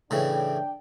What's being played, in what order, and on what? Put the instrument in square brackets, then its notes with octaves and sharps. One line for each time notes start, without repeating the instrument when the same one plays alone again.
[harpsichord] A2 C#3 E3 [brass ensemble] D4 G5